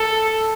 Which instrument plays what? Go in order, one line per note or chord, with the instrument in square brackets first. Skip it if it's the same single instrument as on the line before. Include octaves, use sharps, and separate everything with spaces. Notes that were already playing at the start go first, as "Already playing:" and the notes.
Already playing: [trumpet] A4